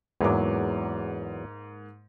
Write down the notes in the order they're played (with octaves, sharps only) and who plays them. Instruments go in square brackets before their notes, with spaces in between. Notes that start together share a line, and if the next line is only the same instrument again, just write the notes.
[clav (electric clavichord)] E2 F#3 [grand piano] G#2 A#3 D6